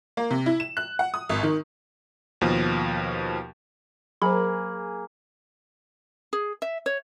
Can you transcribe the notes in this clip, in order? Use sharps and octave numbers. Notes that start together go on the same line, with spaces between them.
A#3
C3
E4
E7
F#6
F#5
D#6
G#1
D#3
D#2 B2 F3
F#3 A#3 G#4 C5 B5
G#4
E5
C#5